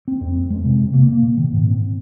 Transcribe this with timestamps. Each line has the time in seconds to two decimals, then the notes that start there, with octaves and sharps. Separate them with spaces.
0.08 C4
0.21 F2
0.35 C4
0.50 G#3
0.65 C3
0.80 C3
0.93 A#3
1.09 A#3
1.22 A#2
1.37 D#3
1.52 G#2
1.66 C4